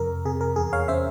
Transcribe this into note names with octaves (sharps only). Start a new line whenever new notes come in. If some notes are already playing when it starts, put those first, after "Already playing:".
Already playing: F2 C3 A#4
C3 G#4
A#4
E2 G#4
C#5 F5
C#4 C5 E5